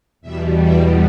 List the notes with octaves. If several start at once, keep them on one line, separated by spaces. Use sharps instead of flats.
E2 B2 G3 E5
E5